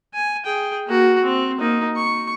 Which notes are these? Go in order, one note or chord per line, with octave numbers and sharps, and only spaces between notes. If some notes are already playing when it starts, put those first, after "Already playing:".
G#5
G#4 G5
A#3 F#4
C4
A#3 D#4
C#6